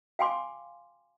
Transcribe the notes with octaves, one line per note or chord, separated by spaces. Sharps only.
F5 G5 G#5 C6 D6